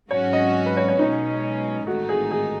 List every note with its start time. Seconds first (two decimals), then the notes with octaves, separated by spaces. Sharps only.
0.11 G#1 G#2 F#3 C#4 F#4 C#5
0.33 D#5
0.66 B4
0.77 C#5
0.88 C#5
0.99 B1 B2 G#3 C#4 D#4
1.87 A1 G#2 D#3 A3 D#4 F#4
2.09 G#4
2.31 G#4